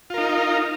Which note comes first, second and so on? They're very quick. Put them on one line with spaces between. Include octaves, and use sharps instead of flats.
F4 A#4 D#4